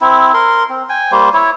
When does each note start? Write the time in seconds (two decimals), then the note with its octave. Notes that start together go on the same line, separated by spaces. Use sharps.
0.01 C4 E4
0.34 A#4 C6
0.69 C4
0.89 G5 G#5
1.12 G3 A#3 C5
1.34 E4 C#5